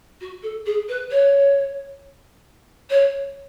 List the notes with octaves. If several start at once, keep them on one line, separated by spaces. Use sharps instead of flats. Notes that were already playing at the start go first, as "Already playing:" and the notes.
F#4
A4
G#4
B4
C#5
C#5